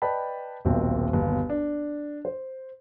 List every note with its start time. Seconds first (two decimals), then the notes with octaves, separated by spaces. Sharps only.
0.02 B4 D5 D#5 G5 A5 B5
0.65 D#1 B1 D#3 C4
1.13 G1 D#2 B2
1.50 D4
2.25 C5